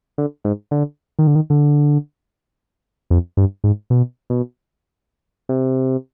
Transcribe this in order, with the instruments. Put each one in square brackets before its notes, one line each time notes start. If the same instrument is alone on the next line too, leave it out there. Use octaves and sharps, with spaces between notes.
[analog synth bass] D3
G#2
D3
D#3
D3
D#3
D3
F2
G2
G#2
B2
B2
C3